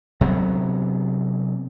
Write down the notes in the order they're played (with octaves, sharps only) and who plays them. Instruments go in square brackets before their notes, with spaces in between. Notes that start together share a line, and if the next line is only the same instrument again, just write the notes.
[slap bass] C3 F#3 B3